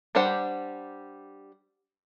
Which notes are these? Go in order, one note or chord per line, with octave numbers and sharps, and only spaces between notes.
G3 D4 G4 C5 F#5